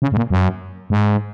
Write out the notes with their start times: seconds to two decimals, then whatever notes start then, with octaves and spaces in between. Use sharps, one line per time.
0.02 C#3
0.12 G#2
0.17 A#2
0.30 F#2
0.90 G#2